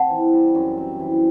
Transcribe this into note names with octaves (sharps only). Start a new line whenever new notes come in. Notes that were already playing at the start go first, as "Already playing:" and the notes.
Already playing: C4 F#5 A5
E3
G3
F#2
C4
E3